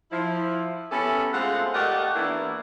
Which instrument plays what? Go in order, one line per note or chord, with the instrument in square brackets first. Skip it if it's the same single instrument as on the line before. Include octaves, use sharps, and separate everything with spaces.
[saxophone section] F3 E4
B3 C#4 E4 G4 A4
G#3 A3 C4 F4 F#5
A3 G4 A#4 D5 D#5 F#5
E3 A#3 B3 D4 E4